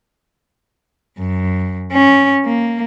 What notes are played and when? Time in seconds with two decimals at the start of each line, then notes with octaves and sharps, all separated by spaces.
1.19 F#2
1.92 C#4
2.45 A#3